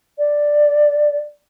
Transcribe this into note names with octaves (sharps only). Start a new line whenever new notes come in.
D5